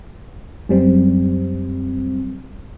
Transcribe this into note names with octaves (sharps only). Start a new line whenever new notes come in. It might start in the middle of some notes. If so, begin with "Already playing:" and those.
F#2 G3 C4